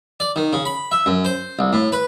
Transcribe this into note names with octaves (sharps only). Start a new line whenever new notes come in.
D5
D#3
C#3
B5
E5
F#2
C5
C2
A2
B4